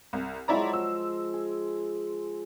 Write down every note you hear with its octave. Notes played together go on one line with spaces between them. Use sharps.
C2
F3 F#3 G#3 E4 D5 A#5
F3 E6
G#4